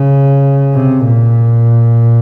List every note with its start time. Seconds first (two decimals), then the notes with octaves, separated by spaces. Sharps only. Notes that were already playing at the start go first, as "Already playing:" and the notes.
Already playing: C#3
0.74 C3
1.05 A#2